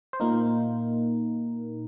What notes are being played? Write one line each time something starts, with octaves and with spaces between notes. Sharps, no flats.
C5
A#2 A#3 D#4 A#4